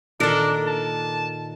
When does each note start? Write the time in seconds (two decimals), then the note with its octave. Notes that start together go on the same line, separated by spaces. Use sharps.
0.20 A#2 D#3 D4 A4 A#4
0.67 A5